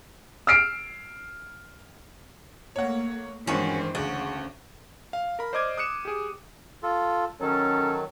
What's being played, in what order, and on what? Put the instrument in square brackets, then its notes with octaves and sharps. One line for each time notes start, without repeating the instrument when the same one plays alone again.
[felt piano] E6 F6 C7 D7
[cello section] A3 A#3 [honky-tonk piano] C#5 F#5
[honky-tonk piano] G2 D#3 [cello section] E3 G#3 C5 [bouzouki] C#4 F#4
[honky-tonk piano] D2 [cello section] C#3 [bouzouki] F#4
[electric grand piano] F5
A#4 B5
C5 D5 D#5 D6 F6 G#6
D#6 F#6 C#7 E7
G4 G#4
[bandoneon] F4 A4
[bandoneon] D#3 F#3 [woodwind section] C#4 A4